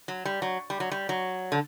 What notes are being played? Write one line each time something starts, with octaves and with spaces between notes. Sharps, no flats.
F#3
G3
F#3
G3
F#3
G3
F#3
D3